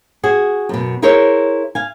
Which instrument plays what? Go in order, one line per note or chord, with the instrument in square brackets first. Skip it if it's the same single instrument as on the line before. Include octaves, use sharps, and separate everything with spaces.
[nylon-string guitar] F#4 G#4
F#2 B2
E4 G#4 A#4 C5 C#5 E5
F5 G#5